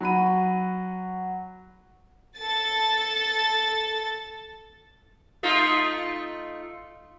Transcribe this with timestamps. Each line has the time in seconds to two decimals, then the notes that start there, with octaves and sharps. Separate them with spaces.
0.01 F#3 F#4 B5 D#7
2.39 A4 A6
5.43 A3 D#4 F4